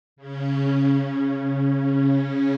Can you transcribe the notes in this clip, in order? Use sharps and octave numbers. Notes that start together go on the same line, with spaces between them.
C#3 C#4